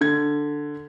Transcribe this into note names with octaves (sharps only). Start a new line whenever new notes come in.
D3 G#6